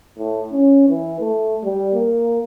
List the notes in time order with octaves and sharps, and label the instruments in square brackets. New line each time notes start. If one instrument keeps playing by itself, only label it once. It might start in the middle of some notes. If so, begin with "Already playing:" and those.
[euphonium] A2
C#4
E3
A3
G3
A#3